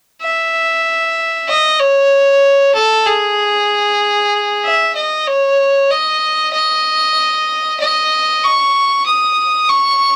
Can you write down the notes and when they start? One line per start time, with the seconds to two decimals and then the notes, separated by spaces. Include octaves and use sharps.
0.22 E5
1.48 D#5
1.80 C#5
2.74 A4
3.05 G#4
4.64 E5
4.96 D#5
5.28 C#5
5.91 D#5
6.54 D#5
7.80 D#5
8.44 C#6
9.06 D#6
9.70 C#6